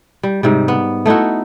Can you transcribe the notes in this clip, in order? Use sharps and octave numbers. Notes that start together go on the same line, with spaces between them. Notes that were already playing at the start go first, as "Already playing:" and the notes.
G3
G#2 C3 G3
B3
A3 D#4 E4 F#4